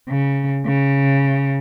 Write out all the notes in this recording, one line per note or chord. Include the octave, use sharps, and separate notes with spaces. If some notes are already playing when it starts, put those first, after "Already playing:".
C#3
C#3